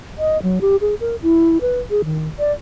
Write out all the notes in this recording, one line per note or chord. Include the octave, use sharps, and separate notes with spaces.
D#5
F#3
G4
G#4
A#4
E4
B4
G#4
D#3
D5